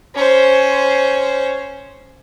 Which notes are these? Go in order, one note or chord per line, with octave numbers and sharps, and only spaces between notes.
C#4 C5